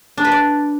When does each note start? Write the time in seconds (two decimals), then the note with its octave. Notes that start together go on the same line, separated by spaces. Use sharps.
0.17 D4
0.25 B4
0.32 D5